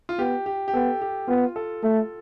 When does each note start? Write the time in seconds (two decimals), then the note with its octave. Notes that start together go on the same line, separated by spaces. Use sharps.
0.09 F4
0.19 B3 G4
0.46 G4
0.68 G4
0.74 B3 A4
1.02 G4
1.28 B3 F4
1.56 A4
1.83 A3 A4